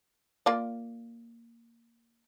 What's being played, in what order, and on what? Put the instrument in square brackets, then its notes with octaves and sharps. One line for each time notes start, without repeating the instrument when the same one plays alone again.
[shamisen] A#3 F4 D5